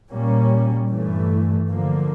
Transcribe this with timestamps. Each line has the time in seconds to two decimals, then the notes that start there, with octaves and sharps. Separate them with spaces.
0.10 A#2 G3 A#3 C#4
0.90 G2 E3 A3
1.70 D3 F3 A#3